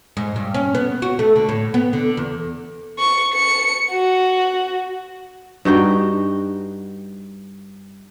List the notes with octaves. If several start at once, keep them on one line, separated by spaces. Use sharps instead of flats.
G#2
G2
C#4
B3
F#4
A3
D3
A2
B3
D3
E2
C#6
C#7
F#4
G2 D#4 F#4 G5